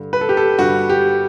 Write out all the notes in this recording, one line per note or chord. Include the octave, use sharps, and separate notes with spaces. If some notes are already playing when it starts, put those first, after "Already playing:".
Already playing: G2 D3
B4
A4
G4
A4
G2 D3 F#4
G4